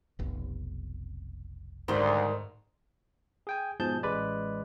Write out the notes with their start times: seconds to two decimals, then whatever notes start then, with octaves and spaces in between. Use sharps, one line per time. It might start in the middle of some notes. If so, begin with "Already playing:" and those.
0.19 F1 B1
1.88 D2 G#2 D#3 G3 C5
3.47 G#4 G5 G#5
3.80 G#2 B2 F3 G#4 A5 G6
4.03 A1 G#3 B4 D5